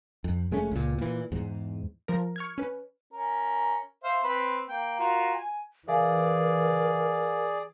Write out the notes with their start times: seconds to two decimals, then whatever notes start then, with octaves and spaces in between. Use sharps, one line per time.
0.24 F2
0.51 F1 G#3 A3 C#4
0.71 C#2 A#2
0.98 A#2 E3
1.32 E2 G#2
2.08 F3 A#4
2.36 C#6 F6 G#6
2.58 C#4 B4
3.13 C#4 A#4
4.04 C5 E5 F5
4.24 C4 B4
4.69 A#3 G5
4.99 F4 F#4 A#4
5.34 G#5
5.88 E3 G#4 A#4 D5 E5 F5 G#5